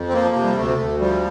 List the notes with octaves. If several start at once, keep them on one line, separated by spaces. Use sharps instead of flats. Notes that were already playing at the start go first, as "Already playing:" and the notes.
Already playing: F2
C4
F3 A#3
C3
G3
D2 A3
D2
F3 G3